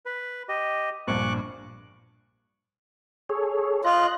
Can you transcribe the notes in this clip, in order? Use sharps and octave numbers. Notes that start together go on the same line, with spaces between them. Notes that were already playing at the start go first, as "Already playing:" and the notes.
B4
G4 D#5
A#1 G2 A#2 C#6 D6 F#6
G#4 A4 C#5
F4 D#5 F#6